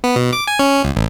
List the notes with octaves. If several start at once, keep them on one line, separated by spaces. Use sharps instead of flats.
B3
B2
D6
G#5
C#4
C#2
A1